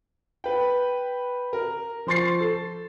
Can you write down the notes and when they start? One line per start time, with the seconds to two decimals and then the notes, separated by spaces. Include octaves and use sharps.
0.44 B4 G5
1.53 A#4
2.07 F3 C5 C6 C#6 A6 C7
2.40 A4